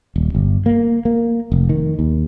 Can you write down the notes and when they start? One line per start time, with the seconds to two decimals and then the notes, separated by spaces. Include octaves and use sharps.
0.16 D#1
0.35 G1
0.66 A#3
1.05 A#3
1.52 F1
1.69 D#3
1.99 D#2